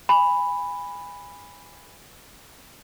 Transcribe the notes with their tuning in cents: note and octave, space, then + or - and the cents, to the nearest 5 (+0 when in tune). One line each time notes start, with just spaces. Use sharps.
G#5 -20 B5 +0